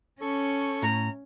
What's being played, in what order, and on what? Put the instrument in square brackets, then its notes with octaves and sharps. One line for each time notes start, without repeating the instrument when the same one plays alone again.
[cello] C#4 [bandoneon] A4 C#6
[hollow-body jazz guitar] A2 [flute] A#5